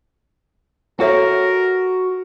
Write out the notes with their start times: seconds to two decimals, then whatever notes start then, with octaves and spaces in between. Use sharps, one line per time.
1.00 F#4 A4 A#4 C#5 E5